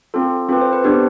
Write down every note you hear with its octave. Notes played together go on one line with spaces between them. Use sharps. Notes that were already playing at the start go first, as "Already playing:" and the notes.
C4 F4 A4
C4 F4 A4 B4
C5
B4
B3 D4 G4 C5